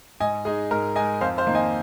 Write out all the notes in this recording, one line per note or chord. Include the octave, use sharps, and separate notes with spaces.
G#2 D#5 G#5
G#3 D#4 G#4
G#2 A#4
G#3 D#4 D#5 G#5
F2 C5 F5
C5 F5
D#3 A#3 D#4
D#5 G#5